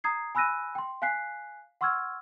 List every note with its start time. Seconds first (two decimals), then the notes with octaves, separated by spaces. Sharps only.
0.04 A#5 D#6 G#6 C7
0.35 G#5 B5 E6 F#6 A#6 D#7
0.75 G5 C6
1.02 F5 G#5 F#6 B6 C7
1.81 F#5 C6 C#6 E6 F6 G#6